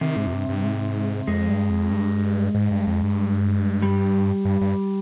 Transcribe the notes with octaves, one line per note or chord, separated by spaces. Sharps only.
C3 D#3
G#2
F2
G2
G2
G#2
F2 G#3
G2
F2
G2
G#2
G2
F2
G2
G3
G2
G2